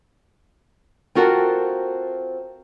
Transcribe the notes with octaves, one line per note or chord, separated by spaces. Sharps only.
C4 F4 F#4 A4 A#4